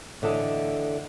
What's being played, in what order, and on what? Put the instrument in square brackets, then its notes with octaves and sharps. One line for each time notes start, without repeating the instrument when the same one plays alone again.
[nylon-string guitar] A2 D3 E3 A4 D#5